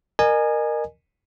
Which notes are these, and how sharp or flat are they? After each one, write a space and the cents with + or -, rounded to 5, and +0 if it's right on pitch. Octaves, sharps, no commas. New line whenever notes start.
A#4 +0 D#5 -35 G#5 +0